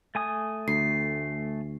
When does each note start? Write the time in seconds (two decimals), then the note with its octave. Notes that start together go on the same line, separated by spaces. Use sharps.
0.15 A3 G#5 D#6
0.68 D2 C7